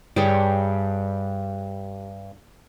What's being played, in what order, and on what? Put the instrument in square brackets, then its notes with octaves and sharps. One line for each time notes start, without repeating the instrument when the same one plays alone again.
[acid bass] G2 [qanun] G3 G#4 C#5